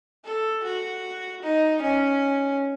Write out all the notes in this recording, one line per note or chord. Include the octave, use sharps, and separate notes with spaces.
A4
F#4
D#4
C#4